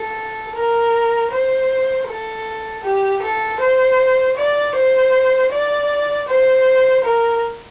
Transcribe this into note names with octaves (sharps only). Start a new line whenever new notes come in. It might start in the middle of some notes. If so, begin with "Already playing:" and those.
Already playing: A4
A#4
C5
A4
G4
A4
C5
D5
C5
D5
C5
A#4